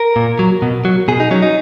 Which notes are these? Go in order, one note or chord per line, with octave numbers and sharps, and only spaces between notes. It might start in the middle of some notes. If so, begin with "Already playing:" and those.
Already playing: A#4
A#2
F#3
B2
F#3
B2 G#4
D#4
F#3 C#4
D#4